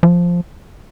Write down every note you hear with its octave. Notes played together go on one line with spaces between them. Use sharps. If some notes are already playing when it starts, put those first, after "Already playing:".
F3